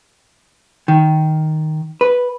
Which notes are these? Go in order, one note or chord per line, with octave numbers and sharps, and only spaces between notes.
D#3
B4